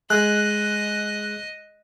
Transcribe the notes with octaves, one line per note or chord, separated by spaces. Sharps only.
G#3 D#5 F#6